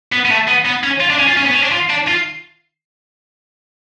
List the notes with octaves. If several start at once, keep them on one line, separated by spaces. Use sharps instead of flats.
B3
B3
A3
B3
B3
C#4
F4
D4
C#4
F4
C#4
B3
C#4
D4
F4
D4
F4